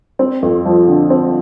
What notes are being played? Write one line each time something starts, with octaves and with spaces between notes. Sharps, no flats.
C4
F2
F3
D3
C4